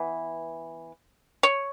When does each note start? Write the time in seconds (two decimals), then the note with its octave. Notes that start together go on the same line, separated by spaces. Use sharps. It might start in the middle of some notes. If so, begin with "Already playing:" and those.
Already playing: E3 B3
1.43 C#5